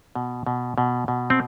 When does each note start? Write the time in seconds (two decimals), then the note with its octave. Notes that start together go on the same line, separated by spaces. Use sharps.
0.15 B2
0.47 B2
0.78 B2
1.08 B2
1.30 C4